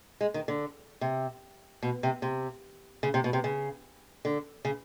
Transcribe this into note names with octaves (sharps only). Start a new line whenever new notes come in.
G#3
D#3
D3
C3
B2
C3
C3
C#3
C3
B2
C3
C#3
D3
C#3